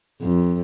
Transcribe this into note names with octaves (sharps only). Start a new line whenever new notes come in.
F2